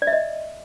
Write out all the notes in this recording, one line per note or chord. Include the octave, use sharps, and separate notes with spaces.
D5
E5
D#5